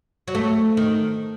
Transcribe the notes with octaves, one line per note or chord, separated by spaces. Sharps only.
F#3
A3
D#3